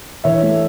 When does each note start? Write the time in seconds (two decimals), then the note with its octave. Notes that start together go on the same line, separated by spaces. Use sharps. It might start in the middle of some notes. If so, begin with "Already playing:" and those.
0.24 E3 C#5 E5
0.42 A3